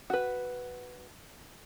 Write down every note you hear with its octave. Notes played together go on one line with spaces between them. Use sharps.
F#4 B4